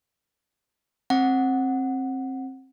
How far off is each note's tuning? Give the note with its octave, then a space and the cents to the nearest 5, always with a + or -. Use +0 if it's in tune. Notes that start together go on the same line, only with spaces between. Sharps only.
C4 +20 F#5 +0